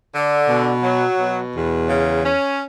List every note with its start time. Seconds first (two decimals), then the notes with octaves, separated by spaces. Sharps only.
0.13 D3
0.48 B2
0.83 F#3
1.18 B2
1.55 E2
1.89 C#3
2.25 C#4